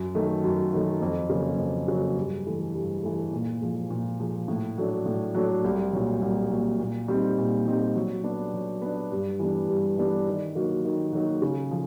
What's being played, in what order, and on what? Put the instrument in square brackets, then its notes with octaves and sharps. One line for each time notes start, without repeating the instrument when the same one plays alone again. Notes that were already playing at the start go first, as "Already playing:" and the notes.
Already playing: [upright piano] F#2
D#3 F#3 A3
F#2
D#3 F#3 A3
F2
C#3 F#3 A#3
F2
C#3 F#3 A#3
G2
E3 A3
G2
E3 A3
A#2
F3 G#3
A#2
F3 G#3
A2
F#3 A3 D4
A2
F#3 A3 D4
C2
A#2 F#3
C2
A#2 F#3
A#2
G3 C4 D#4
A#2
G3 C4 D#4
F#3
B3 D4
F#3
B3 D4
G2
E3 G3 B3 D4
G2
E3 G3 B3 D4
D#3
F#3 A#3 D#4 F#4
D#3
F#3 A#3 D#4 F#4
C#3
F3